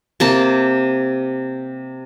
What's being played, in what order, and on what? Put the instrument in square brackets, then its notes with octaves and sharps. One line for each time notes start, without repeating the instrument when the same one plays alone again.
[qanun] C3 A#3 A5